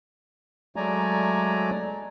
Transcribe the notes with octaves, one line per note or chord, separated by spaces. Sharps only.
F#3 G#3 A3 D5 G#5 A#5